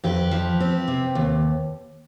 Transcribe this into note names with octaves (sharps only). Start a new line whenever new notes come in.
F2 G4 B4
F3
C4
C3
D#2